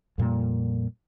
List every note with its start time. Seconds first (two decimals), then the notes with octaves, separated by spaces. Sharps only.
0.18 F2 A#2 G3 A#3